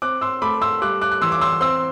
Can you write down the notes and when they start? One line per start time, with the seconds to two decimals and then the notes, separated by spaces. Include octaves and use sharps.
0.02 C4 D6 F#6
0.21 C6 E6
0.42 A3 B5 D6
0.62 C6 E6
0.82 G3 D6 F#6
1.01 D6 F#6
1.12 F#6
1.21 E3 C6 E6
1.32 D6
1.41 C6 E6
1.61 C4 C6 E6